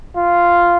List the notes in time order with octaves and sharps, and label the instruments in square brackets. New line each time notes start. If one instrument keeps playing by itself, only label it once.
[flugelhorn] F4